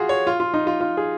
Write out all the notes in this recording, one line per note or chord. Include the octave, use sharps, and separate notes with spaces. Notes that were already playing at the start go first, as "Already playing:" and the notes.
Already playing: F4 F#4 G#4
C#5
F4
F4
D#4
F4
F4
G#4